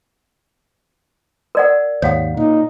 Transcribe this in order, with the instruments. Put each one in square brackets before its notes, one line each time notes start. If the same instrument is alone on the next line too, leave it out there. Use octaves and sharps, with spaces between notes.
[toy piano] A#4 D5 F#5
[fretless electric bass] D#2 G#2 [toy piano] C#5 F5 F#5
[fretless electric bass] A#2 [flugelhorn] D#4